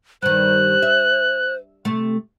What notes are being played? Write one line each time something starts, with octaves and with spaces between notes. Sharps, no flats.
G2 D#3 C5 F#6
E5
C3 A3